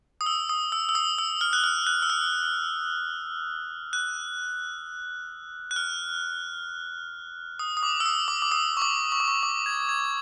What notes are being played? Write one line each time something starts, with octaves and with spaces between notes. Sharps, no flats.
D#6
E6
D#6
E6
E6
D#6
E6
F6
F#6
F6
F#6
E6
F6
F#6
F#6
F6
D#6
D#6
D6
E6
D#6
D6
D6
D#6
C#6
D6
C#6
D6
C#6
D6
G#6
G#6